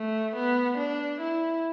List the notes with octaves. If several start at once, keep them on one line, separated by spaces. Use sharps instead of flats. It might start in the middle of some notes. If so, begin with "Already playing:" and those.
Already playing: A3
B3
D4
E4